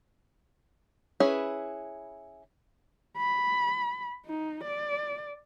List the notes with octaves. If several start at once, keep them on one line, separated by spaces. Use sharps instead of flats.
C#4 E4 G#4 B4
B5
D#4
D5